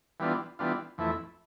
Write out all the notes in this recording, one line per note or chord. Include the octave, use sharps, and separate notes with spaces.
E3 G3 B3 D4 F4
E3 G3 B3 D4 F4
F2 E3 A3 E4